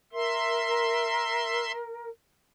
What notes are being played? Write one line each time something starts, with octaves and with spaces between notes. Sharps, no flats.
A#4 E5 C6